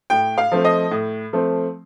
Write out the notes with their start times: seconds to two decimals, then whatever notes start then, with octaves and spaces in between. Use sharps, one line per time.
0.10 A2 G5
0.38 F5
0.52 F3 A3 C4
0.65 D#5
0.91 A2
1.33 F3 A3 C4